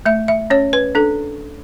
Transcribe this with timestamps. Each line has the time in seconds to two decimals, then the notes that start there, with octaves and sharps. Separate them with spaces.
0.06 A3 E5
0.28 E5
0.50 C#4 C#5
0.73 B4
0.95 D4 A4